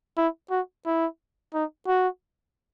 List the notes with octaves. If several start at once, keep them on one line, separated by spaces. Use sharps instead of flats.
E4
F#4
E4
D#4
F#4